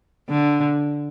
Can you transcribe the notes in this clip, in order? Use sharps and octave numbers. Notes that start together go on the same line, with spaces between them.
D3